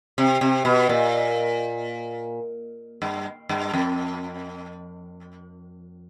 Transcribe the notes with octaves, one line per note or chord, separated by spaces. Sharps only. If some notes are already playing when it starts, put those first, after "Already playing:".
C3
C3
B2
A#2
G2
G2
F2